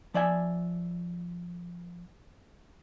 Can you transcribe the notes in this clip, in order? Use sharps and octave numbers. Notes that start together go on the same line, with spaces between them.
F3 D5 E5 G#5